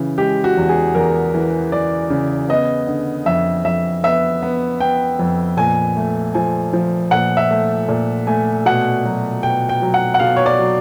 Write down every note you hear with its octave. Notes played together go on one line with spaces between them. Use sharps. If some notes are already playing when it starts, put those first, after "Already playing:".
Already playing: C#3 E3
G#3 G4
F#4
E2
G#4
E2 A#4
E3
E3 D5
C#3
B3 D#5
D3
F2 E5
F2 E5
B3 E5
B3
B3 G5
F2
A#2 G#5
A3
F3 G#5
F3
A#2 F#5
E5
A3
A#2
A3 G#5
B2 F#5
F#3
B2 G5
G5
F#3
F#5
F#5
B2 F5
C#5
D5
F#3